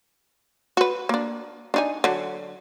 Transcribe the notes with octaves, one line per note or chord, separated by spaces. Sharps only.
F#4 B4
A#3 D4
D4 D#4 G#5
D3 F#3